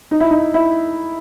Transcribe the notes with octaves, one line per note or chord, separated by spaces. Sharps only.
D#4
E4
D#4
E4